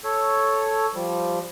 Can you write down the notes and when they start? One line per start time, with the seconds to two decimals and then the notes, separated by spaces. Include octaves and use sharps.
0.04 A4 C#5
0.94 F3 G3